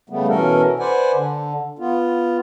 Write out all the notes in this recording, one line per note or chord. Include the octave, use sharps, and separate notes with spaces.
C#3 G3 A3 B3
B2 E3 C#4 A4 A#4
B4 C5 D5 F#5 G#5
D3
B3 F4